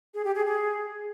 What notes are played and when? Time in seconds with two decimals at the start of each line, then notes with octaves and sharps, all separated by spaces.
0.14 G#4
0.25 G4
0.35 G#4
0.45 G#4